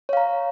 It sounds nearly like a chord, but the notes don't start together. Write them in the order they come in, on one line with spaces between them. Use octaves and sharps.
C#5 F5 A#5